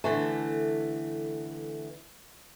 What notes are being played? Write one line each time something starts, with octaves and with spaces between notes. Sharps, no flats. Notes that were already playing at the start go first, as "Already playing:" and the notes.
D3 E3 A3